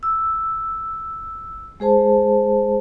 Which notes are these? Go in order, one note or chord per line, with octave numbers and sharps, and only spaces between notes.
E6
G#3 G#4 C5 A5